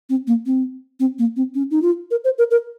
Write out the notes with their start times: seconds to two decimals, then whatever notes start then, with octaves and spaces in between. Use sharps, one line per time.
0.09 C4
0.27 A#3
0.46 C4
1.00 C4
1.19 A#3
1.36 C4
1.55 C#4
1.71 D#4
1.82 F4
2.11 A#4
2.24 C5
2.38 A#4
2.51 A#4